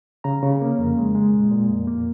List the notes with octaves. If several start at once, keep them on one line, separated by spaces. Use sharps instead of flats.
C#3 A#5
C#3
A#3
F2
G#3
G#3
A#2
A#2
F2
A#3